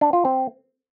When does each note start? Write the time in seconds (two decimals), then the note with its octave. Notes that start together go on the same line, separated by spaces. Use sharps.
0.01 D4
0.13 F4
0.25 C4